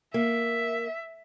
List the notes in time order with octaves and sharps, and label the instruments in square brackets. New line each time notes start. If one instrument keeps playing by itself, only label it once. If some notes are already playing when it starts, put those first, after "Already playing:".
[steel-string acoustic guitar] A#3 [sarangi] E5